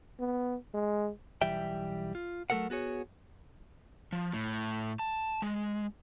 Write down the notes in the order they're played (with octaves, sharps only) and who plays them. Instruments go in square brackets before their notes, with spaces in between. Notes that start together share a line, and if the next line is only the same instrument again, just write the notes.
[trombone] B3
G#3
[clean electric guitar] B1 E3 G3 E5 G5
F4
F#3 A3 B3 A4 A#4 F#5
B3 F#4 G#4 C#5
[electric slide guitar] F3
A2
A5
G#3